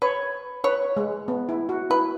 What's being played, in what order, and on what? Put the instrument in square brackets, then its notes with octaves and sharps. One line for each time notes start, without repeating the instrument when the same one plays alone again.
[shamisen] B4 [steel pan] C#5
[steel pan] B4 [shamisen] C#5
[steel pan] G#3
B3
E4
F#4
[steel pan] E4 [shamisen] B4